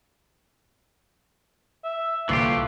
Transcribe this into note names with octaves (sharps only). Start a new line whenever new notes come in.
E5
C2 A#2 D3 E3 A3 F4 G4